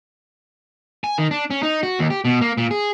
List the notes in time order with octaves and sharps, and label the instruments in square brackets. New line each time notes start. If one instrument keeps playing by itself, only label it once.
[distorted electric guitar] G#5
D#3
D4
C#4
D#4
F#4
D#2
G4
B2
A#3
A#2
G#4